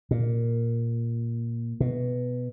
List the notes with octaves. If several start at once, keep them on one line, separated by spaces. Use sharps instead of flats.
A#2
B2